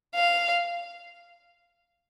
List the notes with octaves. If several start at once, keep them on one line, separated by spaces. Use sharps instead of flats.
F5